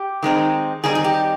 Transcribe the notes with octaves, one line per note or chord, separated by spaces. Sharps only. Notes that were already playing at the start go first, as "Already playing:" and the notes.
Already playing: G4
D#3 G#3 C4 D#4
D#3 G3 C4 D#4 G#4
G#4
G4